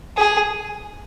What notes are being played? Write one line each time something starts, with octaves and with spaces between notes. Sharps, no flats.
G#4